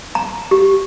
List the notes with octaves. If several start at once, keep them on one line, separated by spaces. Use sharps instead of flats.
A#5
G4